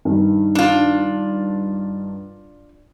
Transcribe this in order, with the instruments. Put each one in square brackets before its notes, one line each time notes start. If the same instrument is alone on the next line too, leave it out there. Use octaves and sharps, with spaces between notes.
[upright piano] G2 D#3
[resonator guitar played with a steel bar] D4 F4